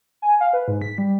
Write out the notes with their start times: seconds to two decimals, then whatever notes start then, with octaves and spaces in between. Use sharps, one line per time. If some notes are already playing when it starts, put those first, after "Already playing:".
0.22 G#5
0.41 F5
0.53 B4
0.68 G#2
0.81 B6
0.98 G3